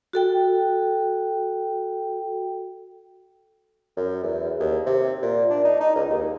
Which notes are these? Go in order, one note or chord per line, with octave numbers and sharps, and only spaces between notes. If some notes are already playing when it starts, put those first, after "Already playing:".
F#4 A4 G5
F#2
E2
D#2
C3
A#2
D4
D#4
D#4
C#2
D#2